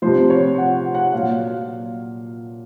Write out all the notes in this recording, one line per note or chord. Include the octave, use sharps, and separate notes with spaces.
C3 F3 C5
C#5
F#5
F#5
A#2 F#3 F5